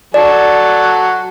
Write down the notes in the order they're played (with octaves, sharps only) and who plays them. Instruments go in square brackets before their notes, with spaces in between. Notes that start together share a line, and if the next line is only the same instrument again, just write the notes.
[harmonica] F#3 F#4 A4 [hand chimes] D5